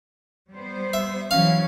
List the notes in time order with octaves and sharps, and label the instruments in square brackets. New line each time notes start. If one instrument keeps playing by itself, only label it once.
[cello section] G3 B3 C5
[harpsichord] E5
[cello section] E3 F#3 C#4 [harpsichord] F5